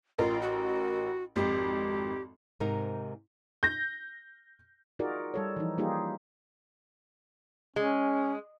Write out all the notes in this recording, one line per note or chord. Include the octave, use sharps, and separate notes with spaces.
A1 F4 A#4
F#4
G#1 F2 G4
G#2 C3 D#4 A#4
G6 A#6
D#4 F4 F#4 G#4 A#4 D5
G3 A4 C#5
E3 F3 D#4
G3 A#3 D#4 F4 G4 G#4
G#3 C#4